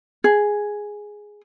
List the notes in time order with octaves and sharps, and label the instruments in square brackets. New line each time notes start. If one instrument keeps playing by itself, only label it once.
[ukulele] G#4